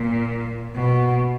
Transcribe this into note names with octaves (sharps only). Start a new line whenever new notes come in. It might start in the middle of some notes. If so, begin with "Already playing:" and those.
Already playing: A#2
B2